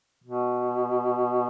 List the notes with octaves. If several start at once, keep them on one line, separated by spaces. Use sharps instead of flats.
B2